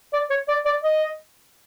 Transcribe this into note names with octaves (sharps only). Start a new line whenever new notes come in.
D5
C#5
D5
D5
D#5